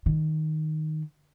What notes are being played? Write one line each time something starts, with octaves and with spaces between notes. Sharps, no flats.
D#3